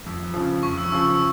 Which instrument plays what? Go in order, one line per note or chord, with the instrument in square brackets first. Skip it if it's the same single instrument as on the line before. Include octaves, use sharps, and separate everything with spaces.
[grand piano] F2
C#3 F3
[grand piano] F2 [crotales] C#6
[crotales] E6
[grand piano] C#3 F3 [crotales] E6
[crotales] E6